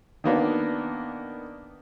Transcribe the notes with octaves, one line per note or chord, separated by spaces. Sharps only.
D#3 A#3 B3 D4